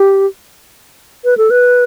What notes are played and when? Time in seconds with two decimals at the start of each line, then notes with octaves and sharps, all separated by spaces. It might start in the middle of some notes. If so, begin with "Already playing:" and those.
Already playing: G4
1.24 B4
1.37 A4
1.50 B4